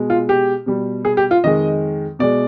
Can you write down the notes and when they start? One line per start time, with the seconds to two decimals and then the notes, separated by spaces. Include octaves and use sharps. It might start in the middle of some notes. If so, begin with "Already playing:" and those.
Already playing: B2 G#3
0.10 F4
0.29 G4
0.66 B2 G3
1.05 G#4
1.17 G4
1.31 F4
1.43 F2 D#3 G#3 D#5
2.19 B2 G#3 D5